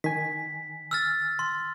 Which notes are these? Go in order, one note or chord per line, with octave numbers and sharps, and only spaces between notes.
D#3 G#5 B6
E6 F6 A6
C6